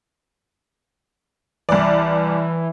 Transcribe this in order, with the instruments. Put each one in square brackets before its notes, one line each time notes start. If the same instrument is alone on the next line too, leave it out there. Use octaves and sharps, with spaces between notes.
[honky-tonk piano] C2 D5 [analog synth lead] E3